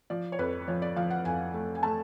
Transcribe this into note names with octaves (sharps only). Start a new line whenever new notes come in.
F3 D5
C#5
F2 B4
F3 C#5
D5
F3 F5
F#5
F2 G#5
A3
G#5
A3 A5